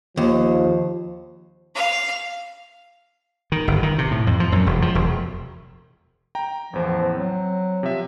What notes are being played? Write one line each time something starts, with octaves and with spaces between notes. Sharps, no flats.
D#2 F3
F5
D#3
G1
D#3
C3
A2
F2
F3
F#2
E1
F3
E1
G5 A#5
A1 E2 F3
F#3 C4
C3 F3 E5